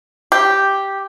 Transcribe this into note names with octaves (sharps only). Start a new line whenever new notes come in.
G4